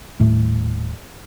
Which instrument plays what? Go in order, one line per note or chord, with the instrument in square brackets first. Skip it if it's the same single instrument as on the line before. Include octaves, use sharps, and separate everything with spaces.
[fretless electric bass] D#1 A2 A3